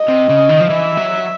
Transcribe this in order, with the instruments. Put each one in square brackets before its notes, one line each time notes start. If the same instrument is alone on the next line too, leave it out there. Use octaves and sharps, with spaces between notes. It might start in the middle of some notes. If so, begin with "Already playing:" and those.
Already playing: [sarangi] D#5
[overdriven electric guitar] C3
C#3
D#3
F3
[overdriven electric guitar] E3 [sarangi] E5
[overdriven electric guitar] F#3